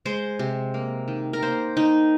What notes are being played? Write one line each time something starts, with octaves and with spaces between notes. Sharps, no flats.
G#3 C5
C3
A#3
D#3
A#4
A#3 C5
D#3 D#4